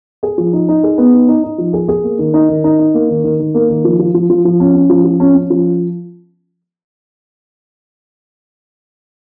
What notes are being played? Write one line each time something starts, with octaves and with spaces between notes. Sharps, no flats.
G#4
F3
D#4
D#4
G#4
B3
D#4
D#4
D#4
F3
G#4
G#4
A#3
D#3
D#4
D#3
D#4
D#4
A#3
D#3
D#3
D#3
A#3
D#3
F3
F3
F3
F3
F3
C#4
C#4
F3
F3
C#4
C#4
F3